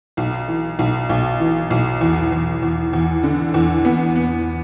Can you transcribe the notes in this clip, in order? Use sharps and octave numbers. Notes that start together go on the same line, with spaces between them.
B1
E3
B1
B1
E3
B1
E2
E2
E2
E2
D3
E2
B3
B3